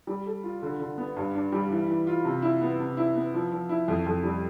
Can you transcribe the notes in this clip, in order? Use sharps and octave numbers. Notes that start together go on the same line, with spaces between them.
G3
A4
F4
D3
D3
B3
G2
D4
G3
E3
E3
F4
C3
E4
B3
C3
E4
B3
F3
F3
E4
F2
F2
G3